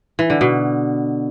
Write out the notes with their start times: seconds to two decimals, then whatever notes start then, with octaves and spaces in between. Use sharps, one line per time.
0.19 E3
0.30 D3
0.41 B2